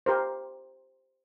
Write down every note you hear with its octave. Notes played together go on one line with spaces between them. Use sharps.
G4 A#4 C5